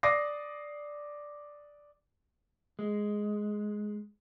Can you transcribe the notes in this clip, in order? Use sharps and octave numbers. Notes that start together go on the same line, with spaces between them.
D5 D6 D#6 A#6 C7
G#3